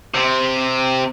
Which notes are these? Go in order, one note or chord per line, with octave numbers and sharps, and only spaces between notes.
C3